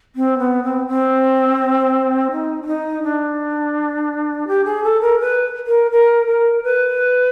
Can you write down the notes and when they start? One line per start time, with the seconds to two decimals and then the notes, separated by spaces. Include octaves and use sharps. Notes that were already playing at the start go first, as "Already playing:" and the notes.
0.16 C4
0.39 B3
0.63 C4
0.88 C4
2.32 D#4
2.62 D4
2.67 D#4
3.04 D4
4.48 G4
4.65 G#4
4.84 A4
5.01 A#4
5.20 B4
5.67 A#4
5.91 A#4
6.27 A#4
6.63 B4